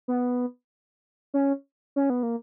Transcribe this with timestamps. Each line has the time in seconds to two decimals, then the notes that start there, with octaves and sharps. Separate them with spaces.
0.08 B3
1.34 C#4
1.96 C#4
2.10 B3
2.23 A#3